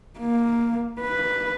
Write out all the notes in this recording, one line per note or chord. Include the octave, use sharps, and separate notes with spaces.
A#3
B4